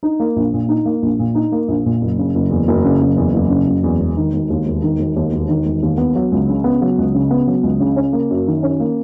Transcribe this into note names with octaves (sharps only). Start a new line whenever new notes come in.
D#4
A#3
A#1
A#2
D#4
A#3
A#1
A#2
D#4
A#3
A#1
A#2
F#1
C#3
F#1
E2
F#1
C#3
F#1
E2
F#1
C#3
F#1
E2
E1
D#3
E1
D#2
E1
D#3
E1
D#2
E1
D#3
E1
D#2
B3
F#3
C#2
C#3
B3
F#3
C#2
C#3
B3
F#3
C#2
C#3
C#4
A#3
F#2
D#3
C#4
A#3